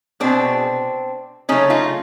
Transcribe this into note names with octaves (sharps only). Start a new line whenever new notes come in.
B2 G#3 C4 D4
C#3 F#3 A3 C#4 D#4
D#4 F4